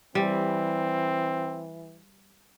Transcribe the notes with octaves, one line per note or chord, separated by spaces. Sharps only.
E3 G3 C4